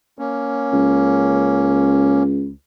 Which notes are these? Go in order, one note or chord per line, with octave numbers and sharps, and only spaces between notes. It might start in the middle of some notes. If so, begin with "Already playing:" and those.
A#3 C#4
C#2